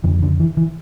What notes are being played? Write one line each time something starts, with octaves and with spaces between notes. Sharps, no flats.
F2 D3 E3
D3
E3
E3